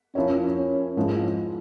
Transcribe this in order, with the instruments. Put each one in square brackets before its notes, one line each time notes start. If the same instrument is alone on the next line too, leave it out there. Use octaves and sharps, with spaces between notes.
[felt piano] F3 A#3 E4 A#4 C#5 [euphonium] C#4
[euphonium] C#4
[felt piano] G#2 F3 G#3 E4